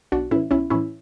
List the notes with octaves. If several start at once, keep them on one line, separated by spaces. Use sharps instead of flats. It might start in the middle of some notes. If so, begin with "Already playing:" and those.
B1 D4 F#4
A2 E3 C#4 E4
B1 C#4 E4
A2 E3 C#4 E4